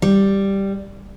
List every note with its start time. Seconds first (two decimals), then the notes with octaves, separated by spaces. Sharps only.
0.02 G3